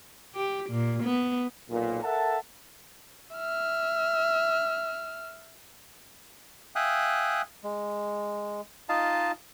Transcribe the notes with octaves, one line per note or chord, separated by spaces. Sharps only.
G4
A#2
B3
B1 A#2
A4 A#4 E5 F#5 A5
E5 F6
E5 F5 G5 G#5 D#6 F#6
G#3
D#4 F4 D#5 F5 A5